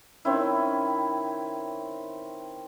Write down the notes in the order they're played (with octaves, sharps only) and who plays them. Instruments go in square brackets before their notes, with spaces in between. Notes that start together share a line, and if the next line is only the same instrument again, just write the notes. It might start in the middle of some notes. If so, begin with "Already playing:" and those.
[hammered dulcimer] D#3 C4 C#4 E4